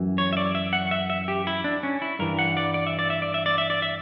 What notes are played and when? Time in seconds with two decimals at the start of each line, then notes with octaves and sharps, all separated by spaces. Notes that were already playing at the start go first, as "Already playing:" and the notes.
Already playing: F#2 E3
0.18 C#5
0.33 E5
0.37 D5
0.55 E5
0.73 F#5
0.91 E5
1.10 E5
1.28 G4
1.47 E4
1.64 D4
1.83 C#4
2.02 E4
2.19 G2 E3 A#4
2.39 F#5
2.57 D5
2.74 D5
2.87 E5
2.99 D5
3.10 E5
3.22 D5
3.34 E5
3.46 D5
3.58 E5
3.70 D5
3.82 E5